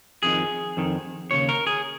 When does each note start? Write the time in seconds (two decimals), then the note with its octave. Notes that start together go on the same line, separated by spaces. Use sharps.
0.23 F2 D#3 G#4
0.77 F2 D#3
1.31 D#2 C#3 C#5
1.49 A#4
1.67 G#4